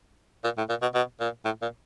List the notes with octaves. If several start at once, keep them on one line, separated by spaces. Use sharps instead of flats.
A#2
A2
A#2
B2
B2
A#2
A2
A#2